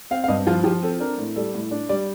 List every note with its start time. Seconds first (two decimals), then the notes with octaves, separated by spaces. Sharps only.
0.11 C4 F5
0.24 F5
0.28 G2 D#5
0.47 F3 F4
0.64 F3 G4
0.83 C4 A4
1.00 D4 A#4
1.18 A2
1.36 G3 A4
1.54 A2
1.71 D4
1.89 G3 D5